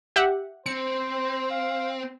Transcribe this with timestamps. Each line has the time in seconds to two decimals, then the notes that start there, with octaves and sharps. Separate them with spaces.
0.16 G4 E5 F#5
0.66 C4 C5 C#7
1.50 F5